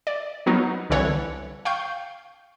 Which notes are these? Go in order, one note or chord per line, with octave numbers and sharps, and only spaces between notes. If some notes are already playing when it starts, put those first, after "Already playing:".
D5
F#3 B3 D#4 A#4
C2 D3 E3 C#5 F#5
F5 G5 C#6 G6